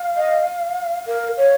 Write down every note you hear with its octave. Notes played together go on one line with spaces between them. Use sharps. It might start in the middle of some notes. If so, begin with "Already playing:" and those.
Already playing: F5
D#5
A#4 F5
C#5